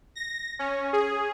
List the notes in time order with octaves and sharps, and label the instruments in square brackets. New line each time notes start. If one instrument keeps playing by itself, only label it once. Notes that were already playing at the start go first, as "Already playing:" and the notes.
[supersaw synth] A#6
C#4
G#4